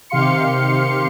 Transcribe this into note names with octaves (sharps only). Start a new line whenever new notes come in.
C3 D#3 G4 F5 C6 C#7